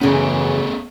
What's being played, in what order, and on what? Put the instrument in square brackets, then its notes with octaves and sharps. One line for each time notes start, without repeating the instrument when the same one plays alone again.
[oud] F#2 C#3 [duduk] E3 [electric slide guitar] B3 G#4 A4 [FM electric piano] C#4